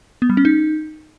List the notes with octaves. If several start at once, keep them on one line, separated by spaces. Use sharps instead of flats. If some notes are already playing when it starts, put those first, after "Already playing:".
B3
G3
C#4
D#4